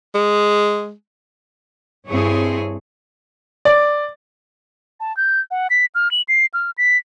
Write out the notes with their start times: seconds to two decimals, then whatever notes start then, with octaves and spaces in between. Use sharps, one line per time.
0.15 G#3
2.07 G2 C4 E4 G#4 C#5
3.65 D5
5.00 A5
5.17 G6
5.51 F#5
5.70 B6
5.95 F6
6.11 F#7
6.28 C7
6.54 F6
6.78 B6